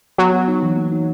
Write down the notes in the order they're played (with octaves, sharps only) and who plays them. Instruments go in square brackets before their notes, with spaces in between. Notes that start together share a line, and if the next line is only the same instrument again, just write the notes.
[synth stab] F#3 [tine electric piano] B3
[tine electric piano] B3
D#4
E3
A#3
D#4